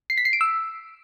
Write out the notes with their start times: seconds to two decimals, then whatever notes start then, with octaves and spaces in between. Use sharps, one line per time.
0.10 C7
0.18 B6
0.25 C7
0.33 D7
0.41 E6